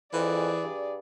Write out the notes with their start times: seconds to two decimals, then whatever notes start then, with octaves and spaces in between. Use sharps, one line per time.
0.13 F2 E3 G#4 D5
0.64 G2